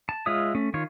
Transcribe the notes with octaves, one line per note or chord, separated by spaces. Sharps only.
A5
G#3 F4 C#5 E5 D#6
A3 C#4
D#3 F4 C#5